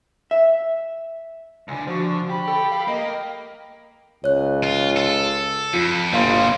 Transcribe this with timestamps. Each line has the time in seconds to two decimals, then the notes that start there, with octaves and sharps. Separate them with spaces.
0.31 E5
1.68 C#2 D3 G#5
1.87 D3 F3 F#4
2.30 G4 B5
2.48 A4 G5
2.72 F5
2.88 A#3 D#5
4.24 C#2 C#5 F#6
4.63 F4
4.96 A4
5.74 F2 F4 B6
6.12 G1 B2 G3 A#3 F5 C6